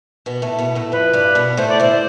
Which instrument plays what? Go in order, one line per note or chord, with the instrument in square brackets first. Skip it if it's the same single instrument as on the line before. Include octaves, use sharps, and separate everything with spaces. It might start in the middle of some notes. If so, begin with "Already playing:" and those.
[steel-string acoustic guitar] B2 B3
A2 A3
B2 B3
A2 A3
[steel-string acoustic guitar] F2 F3 [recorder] B4
[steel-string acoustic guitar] G2 G3
B2 B3
[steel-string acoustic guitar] A2 A3 [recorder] C5
[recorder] D5
[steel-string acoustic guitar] D2 D3 [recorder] C5